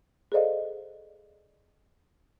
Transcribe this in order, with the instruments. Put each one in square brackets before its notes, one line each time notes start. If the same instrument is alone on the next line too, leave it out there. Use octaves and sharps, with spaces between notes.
[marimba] G#4 A4 C5 D5 D#5 F5